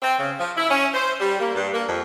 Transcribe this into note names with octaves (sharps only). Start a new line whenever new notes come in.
C4
C#3
F3
E4
C#4
C5
G3
A#3
G2
A#3
F2